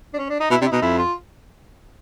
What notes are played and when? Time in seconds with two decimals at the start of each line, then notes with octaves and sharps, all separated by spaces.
0.14 D4
0.19 C#4
0.29 D4
0.40 D#4
0.51 B2 E4
0.61 C3 D4
0.66 E4
0.72 B2 D#4
0.82 F2 E4
0.98 F4